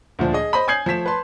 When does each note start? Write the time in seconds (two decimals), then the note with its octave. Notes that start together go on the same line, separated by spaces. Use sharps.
0.19 D2 A#2 F3 D4
0.33 G#4 D#5
0.53 C5 D#5 B5
0.68 G#5 D#6 G6 G#6 C7 F#7
0.86 F3 A3 B6 E7
1.06 B4 A5 C6